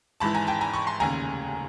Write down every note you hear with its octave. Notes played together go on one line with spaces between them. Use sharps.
G#1 G#2 E3 A5 B5
G#5 A#5
G5 A5
G#5 A#5
B5 C#6
A#5 C6
F1 D#2 C#3 G#5 A#5